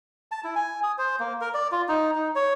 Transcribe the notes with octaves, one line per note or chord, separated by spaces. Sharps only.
A5
E4
G#5
D#6
C5
A#3
A#4
D5
F4
D#4
D#4
C#5